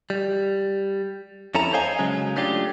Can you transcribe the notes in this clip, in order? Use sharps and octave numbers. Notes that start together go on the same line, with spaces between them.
G3
F2 C#4 E4 A4 A#5
C5 C#5 D#5 F5 G#5
C#3 F#3 G#3 C#4
A3 C#4 D4 F4 G4